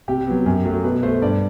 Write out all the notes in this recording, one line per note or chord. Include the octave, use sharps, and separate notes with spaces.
C3 G4
F#3 B3
F#2
F#3 A3
B2 B4
A3 C5
G2 D5